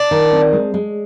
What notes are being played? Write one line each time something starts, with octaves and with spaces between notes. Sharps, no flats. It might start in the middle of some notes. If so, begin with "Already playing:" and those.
Already playing: D4
D#3
C4
G#3
G#3